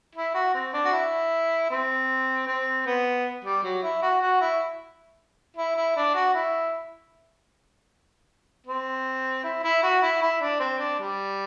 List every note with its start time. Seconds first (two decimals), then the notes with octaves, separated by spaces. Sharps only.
0.15 E4
0.35 F#4
0.54 C4
0.73 D4
0.85 F#4
0.92 E4
1.70 C4
2.47 C4
2.86 B3
3.44 G3
3.63 F#3
3.83 E4
4.02 F#4
4.21 F#4
4.41 E4
5.57 E4
5.76 E4
5.96 D4
6.15 F#4
6.34 E4
8.67 C4
9.44 E4
9.64 E4
9.83 F#4
10.02 E4
10.22 E4
10.41 D4
10.60 C4
10.79 D4
10.99 G3